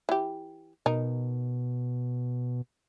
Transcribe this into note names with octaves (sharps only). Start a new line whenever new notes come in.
E3 G4
B2 D#4 A#4